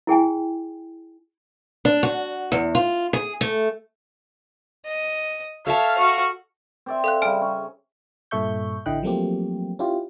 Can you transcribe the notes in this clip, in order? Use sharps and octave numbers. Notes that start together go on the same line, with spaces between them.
E4 G#4 G5 G#5
D4
F#4
E2
F4
G#4
A3
D#5
A4 C#5 E5 F5 A5
F#4 C#6
C4 D5 E5
A4 F5 F#6
C#3 G3 G#5 F6 D7
C#4
G2 A#2 A4 E5 C#6 G6
A1 D3 E4 D#5 G5 F#6
F3 F#3 A3 A#3 C4 G4
C#4 E4 F4 G4